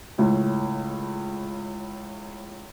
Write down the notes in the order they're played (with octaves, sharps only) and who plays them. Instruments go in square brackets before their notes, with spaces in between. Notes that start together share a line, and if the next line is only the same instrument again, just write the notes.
[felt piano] C#2 A2